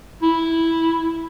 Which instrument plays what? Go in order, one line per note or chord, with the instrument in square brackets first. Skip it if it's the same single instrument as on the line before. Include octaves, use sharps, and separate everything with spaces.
[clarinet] E4